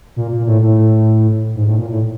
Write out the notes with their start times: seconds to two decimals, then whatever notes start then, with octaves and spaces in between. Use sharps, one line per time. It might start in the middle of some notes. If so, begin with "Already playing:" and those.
0.16 A#2
0.32 A#2
0.47 A2
0.62 A2
1.55 G#2
1.67 A2
1.78 A#2
1.90 A2